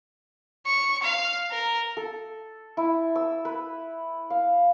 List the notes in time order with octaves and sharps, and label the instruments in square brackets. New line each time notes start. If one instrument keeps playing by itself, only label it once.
[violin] C#6
F5
A#4
[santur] A4
E4
E6
B4
F5